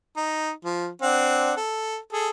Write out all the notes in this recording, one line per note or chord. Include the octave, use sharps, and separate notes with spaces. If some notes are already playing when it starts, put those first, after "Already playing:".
D#4
F3
C4 D4 F#5
A4
G#4 A4